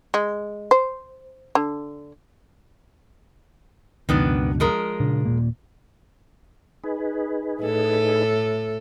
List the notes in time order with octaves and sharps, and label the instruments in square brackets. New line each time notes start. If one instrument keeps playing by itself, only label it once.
[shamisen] G#3
C5
D3
[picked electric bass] C#2 F#2 B2 [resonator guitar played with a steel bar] D#3 B3 D4
[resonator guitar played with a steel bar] F3 G#3 A#4
[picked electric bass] A#2 C#3 D4
D#1 A#2 A#3
[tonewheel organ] D#4 G#4 B4
[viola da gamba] A2 A4